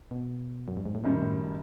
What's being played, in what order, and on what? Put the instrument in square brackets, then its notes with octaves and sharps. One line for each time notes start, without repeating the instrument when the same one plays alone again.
[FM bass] B2
F#2
G2
G#2
A2
[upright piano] F#1 F#2 D#3 G3 [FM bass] A#2
[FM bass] A2